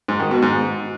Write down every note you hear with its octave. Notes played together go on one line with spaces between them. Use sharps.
G#2
D#3
B2
G#2